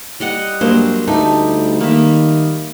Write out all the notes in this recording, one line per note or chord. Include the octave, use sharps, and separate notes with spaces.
G3 D#5 F#5
G2 F#3 G#3 A#3 C5
D2 G3 A3 D#4 A4
D#3 A#3 E5